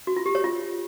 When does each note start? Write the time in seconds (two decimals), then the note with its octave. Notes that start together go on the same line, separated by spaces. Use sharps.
0.07 F#4
0.16 F4
0.26 G4
0.35 C#5
0.44 F4